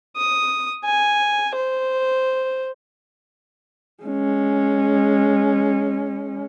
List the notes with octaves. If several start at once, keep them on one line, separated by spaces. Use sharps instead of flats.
D#6
G#5
C5
G#3 C#4